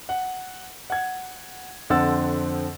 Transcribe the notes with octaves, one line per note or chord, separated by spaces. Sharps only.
F#5
F#5 G#6
F2 D3 C4 F#5 E6 A6